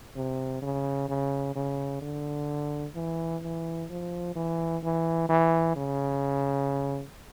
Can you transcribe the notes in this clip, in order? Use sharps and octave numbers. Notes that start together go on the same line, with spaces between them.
C3
C#3
C#3
C#3
D3
E3
E3
F3
E3
E3
E3
C#3